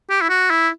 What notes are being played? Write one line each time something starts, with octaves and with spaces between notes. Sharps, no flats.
G4
E4
F#4
E4